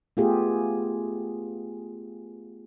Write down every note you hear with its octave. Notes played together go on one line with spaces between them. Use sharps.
A3 B3 F4 G4 G#4